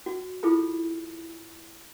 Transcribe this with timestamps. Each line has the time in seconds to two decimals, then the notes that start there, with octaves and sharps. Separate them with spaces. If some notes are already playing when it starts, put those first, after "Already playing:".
0.06 F#4
0.43 E4 F4 G#4 A4 B5